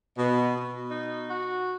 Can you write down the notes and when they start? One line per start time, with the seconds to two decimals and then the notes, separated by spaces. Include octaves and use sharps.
0.18 B2
0.55 B2
0.91 D#4
1.28 F#4